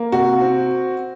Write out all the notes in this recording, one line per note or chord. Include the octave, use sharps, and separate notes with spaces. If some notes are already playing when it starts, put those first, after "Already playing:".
Already playing: A#3
C3 F#4
C4